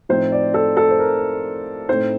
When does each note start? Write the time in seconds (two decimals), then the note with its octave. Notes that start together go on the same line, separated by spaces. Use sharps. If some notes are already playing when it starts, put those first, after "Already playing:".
0.09 A2 F3 C4 D#4 C5
0.32 D5
0.54 A4
0.77 A4
0.91 C5
0.99 A#4
1.89 A2 A3 C4 D#4 C5